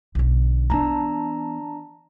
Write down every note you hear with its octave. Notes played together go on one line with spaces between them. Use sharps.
B1 D3
E3 B3 D4 A5 A#5